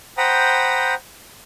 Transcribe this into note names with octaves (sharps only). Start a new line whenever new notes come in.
C5 F#5 G5 A#5 B5 D#6